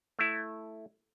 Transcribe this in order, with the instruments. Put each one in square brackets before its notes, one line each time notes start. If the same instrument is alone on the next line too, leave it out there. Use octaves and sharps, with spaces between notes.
[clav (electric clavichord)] A3 E4